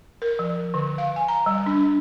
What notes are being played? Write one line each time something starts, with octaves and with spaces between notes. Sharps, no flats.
A#4
F3
D3
F5
G#5
A#5
G3
D4